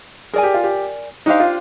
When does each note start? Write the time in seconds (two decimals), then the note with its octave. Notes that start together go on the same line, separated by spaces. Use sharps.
0.33 G#4 A#4 D5 G#5
0.43 G4
0.54 F4
0.64 G4
1.26 D4 D#4 G4 C5 F5
1.40 F4